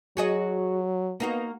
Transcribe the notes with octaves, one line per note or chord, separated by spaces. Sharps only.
F#3 F#4 G#4 D#5
A#3 B3 D#4 F#4